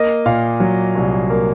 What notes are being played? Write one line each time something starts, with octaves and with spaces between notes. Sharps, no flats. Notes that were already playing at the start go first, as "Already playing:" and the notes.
Already playing: A#3 D#5
A#2 F5
F#3
C2
A#3